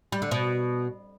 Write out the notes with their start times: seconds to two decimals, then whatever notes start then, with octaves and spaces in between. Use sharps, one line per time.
0.12 G3
0.22 D3
0.31 B2